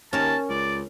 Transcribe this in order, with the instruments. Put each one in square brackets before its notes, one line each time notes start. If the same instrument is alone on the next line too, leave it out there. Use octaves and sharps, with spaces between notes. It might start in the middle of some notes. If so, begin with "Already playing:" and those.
[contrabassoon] D#2 [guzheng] C#4 A#4 [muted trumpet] A5
[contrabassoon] C#2 [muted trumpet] D5